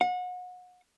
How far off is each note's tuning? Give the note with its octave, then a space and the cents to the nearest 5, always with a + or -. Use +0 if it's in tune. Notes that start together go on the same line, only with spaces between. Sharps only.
F#5 -30